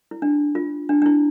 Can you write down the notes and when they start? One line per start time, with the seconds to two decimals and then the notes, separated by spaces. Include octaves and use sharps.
0.11 E4
0.22 D4
0.55 F4
0.89 D4
1.02 D4
1.06 E4